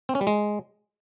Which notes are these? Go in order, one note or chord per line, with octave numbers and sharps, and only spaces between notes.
C4
C#4
G3
G#3